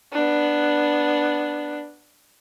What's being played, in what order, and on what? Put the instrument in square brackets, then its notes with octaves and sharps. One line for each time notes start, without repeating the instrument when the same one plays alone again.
[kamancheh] B3 D4